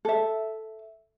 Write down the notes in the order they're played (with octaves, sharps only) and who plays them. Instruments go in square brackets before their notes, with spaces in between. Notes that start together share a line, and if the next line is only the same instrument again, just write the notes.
[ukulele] A4 E5